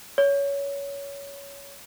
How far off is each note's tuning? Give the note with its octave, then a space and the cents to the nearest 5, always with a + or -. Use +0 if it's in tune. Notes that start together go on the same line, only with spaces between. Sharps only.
C#5 +20